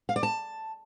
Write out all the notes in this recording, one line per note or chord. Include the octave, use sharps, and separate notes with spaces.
F5
D5
A5